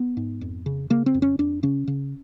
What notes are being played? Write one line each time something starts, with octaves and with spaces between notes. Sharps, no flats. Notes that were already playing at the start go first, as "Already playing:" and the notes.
Already playing: B3
G#2
F2
C#3
C#3 A#3
C4
F2
C#4
F2 D4
C#3 C#4
C#3